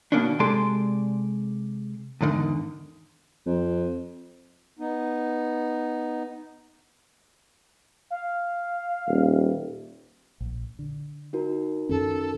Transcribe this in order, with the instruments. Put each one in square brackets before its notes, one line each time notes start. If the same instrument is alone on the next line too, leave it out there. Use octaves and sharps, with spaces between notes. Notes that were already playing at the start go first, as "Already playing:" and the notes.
[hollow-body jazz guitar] B2 D#3 A#3 B3 C#4 D4
C3 G#3 G4 A4 D5 C6
E2 G#2 D3 D#3
[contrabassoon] F2
[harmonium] B3 D#4
[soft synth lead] F5
[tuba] D#1
[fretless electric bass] A#1
D3
[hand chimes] D#4 F#4 A#4
[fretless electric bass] F#2 D#3 C#4 [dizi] A4